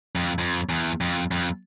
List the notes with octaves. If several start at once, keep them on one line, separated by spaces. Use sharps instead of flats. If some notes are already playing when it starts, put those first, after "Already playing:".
F2
F2
E2
F2
F2